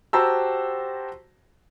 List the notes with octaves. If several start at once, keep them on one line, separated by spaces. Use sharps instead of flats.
F#4 G4 C5 A5 A#5 E6